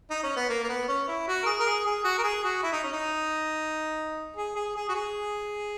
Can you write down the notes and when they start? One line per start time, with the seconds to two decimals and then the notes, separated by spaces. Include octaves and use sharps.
0.10 D#4
0.24 C#4
0.36 B3
0.49 A#3
0.63 A#3
0.69 B3
0.88 C#4
1.08 E4
1.28 F#4
1.43 A#4
1.46 G#4
1.60 A#4
1.66 G#4
1.86 G#4
2.04 F#4
2.18 A#4
2.24 G#4
2.44 F#4
2.63 E4
2.73 D#4
2.83 C#4
2.92 D#4
4.36 G#4
4.56 G#4
4.76 G#4
4.89 F#4
4.95 G#4